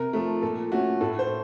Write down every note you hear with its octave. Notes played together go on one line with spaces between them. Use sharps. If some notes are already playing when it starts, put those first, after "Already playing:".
Already playing: C3 A#4
F3 A3
A#2 A4
A3 C#4 F#4
A2 A4
C5